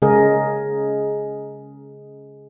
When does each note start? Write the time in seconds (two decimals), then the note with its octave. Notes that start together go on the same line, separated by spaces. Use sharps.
0.02 C#3 G#3 G#4 A#4 D#5